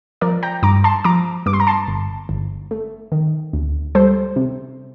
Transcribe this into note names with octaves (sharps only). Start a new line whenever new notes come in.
F3 A#4 D5
G5 A#5
G2 A#5 D6
A5 C6
F3 A#5 D6
G2 D6
C6
A#5
A5 C6
G1
G1
A3
D#3
D2
G3 A4 C5
C3